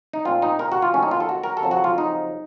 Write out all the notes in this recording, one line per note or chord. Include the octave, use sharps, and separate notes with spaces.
D#4
A#2 A3 C4 F4
D#4
A#4
F#4
F4
F#2 D#3 A3 C4 C#4
D#4
F4
A4
F#4
A#4
A4
F2 C#3 F#3
F#4
F4
D#4